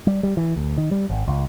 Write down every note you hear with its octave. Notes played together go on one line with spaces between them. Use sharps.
G3
G3
E3
D2
D#3
G3
G#1
C#2